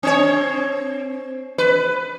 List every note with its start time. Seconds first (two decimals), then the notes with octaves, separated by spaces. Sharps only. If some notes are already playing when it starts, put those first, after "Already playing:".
0.03 C4 C#5
1.58 B4